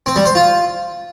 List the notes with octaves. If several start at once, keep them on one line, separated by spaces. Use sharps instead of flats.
C4
G3
C5
F4